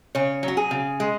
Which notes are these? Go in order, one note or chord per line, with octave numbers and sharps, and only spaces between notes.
C#3 C#5
F#3
F#4
G#4
C#3
G#3